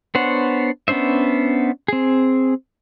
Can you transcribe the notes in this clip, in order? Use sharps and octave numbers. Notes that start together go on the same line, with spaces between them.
B3 D4 C5 C#5 F#5
B3 C#4 D4 C5 E5
C4 G#4